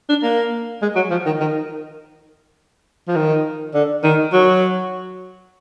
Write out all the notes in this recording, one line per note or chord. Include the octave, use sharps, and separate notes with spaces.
D4
A#3
G#3
F#3
F3
D#3
D#3
F3
D#3
D3
D#3
F#3